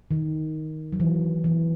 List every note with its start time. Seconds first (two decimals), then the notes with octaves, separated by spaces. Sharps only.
0.11 D#3
0.93 F#3
1.00 E3
1.44 E3